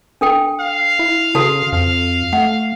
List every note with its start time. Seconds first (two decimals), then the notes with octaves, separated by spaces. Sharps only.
0.21 D4 A4 G5
0.60 F5
0.99 E4
1.35 C#3 F#4 A4 A5
1.73 F2 F5
2.33 A3 F#5